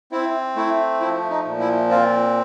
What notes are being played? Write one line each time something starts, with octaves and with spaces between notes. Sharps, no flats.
C4 E4
A3 E4
F3 E4
D#4
A#2
E4
C4 F4